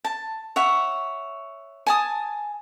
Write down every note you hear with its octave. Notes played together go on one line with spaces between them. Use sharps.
A5
C#5 E5 F#5
G#5 A5 D#6